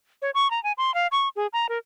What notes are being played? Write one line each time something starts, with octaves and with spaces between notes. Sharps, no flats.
C#5
C#6
A#5
G#5
C6
F5
C#6
G#4
A#5
A#4